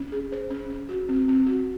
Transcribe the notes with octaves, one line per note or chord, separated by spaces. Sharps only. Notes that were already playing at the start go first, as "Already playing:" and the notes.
Already playing: C#4
G#4
C5
C#4
C#4
F#4
C4
C4
F#4